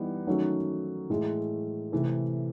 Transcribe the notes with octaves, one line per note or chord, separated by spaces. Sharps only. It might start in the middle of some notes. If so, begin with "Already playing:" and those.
Already playing: E3 G3 B3 D#4
D#3 F#3 A3 C#4 F#4
A2 E3 G#3
C3 E3 A3